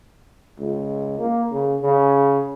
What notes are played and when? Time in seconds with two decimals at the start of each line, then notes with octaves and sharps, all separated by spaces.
0.59 C#2
1.19 A#3
1.51 C#3
1.82 C#3